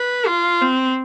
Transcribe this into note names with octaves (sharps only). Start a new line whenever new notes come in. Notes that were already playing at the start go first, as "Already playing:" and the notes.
Already playing: B4
F4
C4